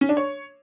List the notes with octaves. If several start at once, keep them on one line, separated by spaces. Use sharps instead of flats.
C#4
D4
C#5